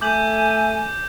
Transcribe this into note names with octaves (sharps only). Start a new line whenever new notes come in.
A3 G#5 D6 G6 F#7